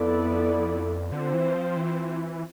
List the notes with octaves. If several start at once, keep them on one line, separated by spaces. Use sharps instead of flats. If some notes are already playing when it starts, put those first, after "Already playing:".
Already playing: F2 B3 E4 A4 D5
D3 C4 F4 C5
E3
F3
E3